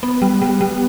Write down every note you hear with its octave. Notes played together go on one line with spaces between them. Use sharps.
B3
G3
G3
G3